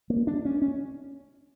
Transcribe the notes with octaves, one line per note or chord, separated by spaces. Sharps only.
A#3
D4
C#4
C#4